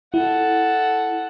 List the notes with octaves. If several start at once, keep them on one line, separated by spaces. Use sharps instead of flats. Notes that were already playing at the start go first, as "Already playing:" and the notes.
E4 A4 F#5